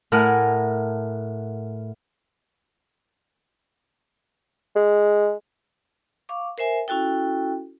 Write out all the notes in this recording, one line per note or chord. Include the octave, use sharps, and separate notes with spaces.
A2 A3 A#4 F#5 G#5
G#3
F5 C#6 D6
A#4 C5 E5 G#5
C#4 E4 F#4 A4 G5